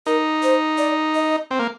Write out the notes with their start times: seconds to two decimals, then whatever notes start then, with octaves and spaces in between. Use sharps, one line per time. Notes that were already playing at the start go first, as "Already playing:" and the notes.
0.06 D#4 A#4
0.43 C5
0.78 D5
1.15 D#5
1.51 C4
1.59 A#3